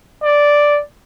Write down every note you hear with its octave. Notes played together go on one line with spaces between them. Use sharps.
D5